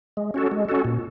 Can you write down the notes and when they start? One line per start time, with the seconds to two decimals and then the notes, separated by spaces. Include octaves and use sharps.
0.17 G#3
0.34 C#4 F#4 A4
0.51 G#3
0.69 C#4 F#4 A4
0.85 A#2